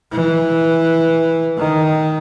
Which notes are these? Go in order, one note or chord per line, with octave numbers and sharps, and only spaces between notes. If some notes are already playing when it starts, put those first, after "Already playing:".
E3
D#3